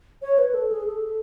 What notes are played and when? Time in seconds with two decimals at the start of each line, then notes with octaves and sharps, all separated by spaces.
0.22 C#5
0.38 B4
0.54 A4
0.71 G#4
0.86 A4